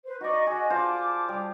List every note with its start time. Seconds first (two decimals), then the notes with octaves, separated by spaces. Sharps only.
0.06 B4 C5
0.21 D#4 F#4 D5 D#5 C#6
0.47 F#4 G#4 D#5
0.70 F4 C5 A5 D6
1.29 G3